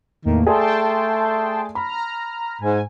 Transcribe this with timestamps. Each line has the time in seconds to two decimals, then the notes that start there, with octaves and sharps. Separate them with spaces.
0.25 E2 A2 D#3 A#3
0.47 A3 G#4 D5 G5 A5 C6
1.75 A#5 B5 F6
2.61 G#2 G#5